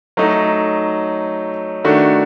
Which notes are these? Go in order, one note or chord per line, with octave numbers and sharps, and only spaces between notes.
F#3 A3 D#4
D#3 A3 D4 F#4